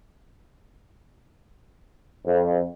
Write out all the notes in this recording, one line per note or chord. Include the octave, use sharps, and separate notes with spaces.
F2